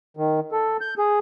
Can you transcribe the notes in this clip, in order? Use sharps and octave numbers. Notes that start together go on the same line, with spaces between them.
D#3
A4
G6
G#4